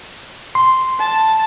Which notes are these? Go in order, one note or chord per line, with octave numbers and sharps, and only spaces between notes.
C6
A5